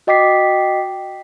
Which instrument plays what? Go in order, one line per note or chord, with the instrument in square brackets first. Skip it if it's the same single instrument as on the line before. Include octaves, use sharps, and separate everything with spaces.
[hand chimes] F#4 D#5 G5 D6 B6 C7